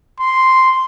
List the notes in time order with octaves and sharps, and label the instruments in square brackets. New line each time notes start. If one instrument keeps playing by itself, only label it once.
[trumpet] C6